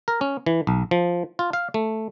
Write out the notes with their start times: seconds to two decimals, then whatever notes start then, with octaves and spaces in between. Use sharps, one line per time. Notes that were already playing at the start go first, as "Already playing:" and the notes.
0.08 A#4
0.21 C#4
0.46 E3
0.67 B1
0.91 F3
1.39 F4
1.53 F5
1.74 A3